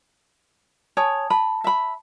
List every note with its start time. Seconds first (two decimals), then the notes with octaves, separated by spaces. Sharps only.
0.97 C#5 G#5 A5 D#6
1.30 A5 B5
1.64 E5 B5